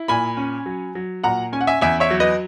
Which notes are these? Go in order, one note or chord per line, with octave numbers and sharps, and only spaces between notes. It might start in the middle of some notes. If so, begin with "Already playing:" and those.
Already playing: E4
A#2 G#5 B5
C#4
F#3
F#3
A#2 F#5 A#5
C#4 G#5
F#5
E5 G#5
E2 E5 G#5
C#5 E5
F#3
B4 D#5